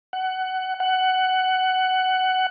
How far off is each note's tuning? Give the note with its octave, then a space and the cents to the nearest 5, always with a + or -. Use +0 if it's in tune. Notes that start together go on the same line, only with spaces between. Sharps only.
F#5 +20
F#5 +15